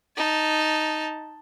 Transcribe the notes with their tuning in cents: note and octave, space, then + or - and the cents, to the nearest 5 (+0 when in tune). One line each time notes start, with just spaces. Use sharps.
D#4 +0 A5 +0